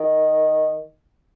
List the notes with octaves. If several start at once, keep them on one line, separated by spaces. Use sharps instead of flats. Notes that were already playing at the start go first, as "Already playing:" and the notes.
Already playing: D#3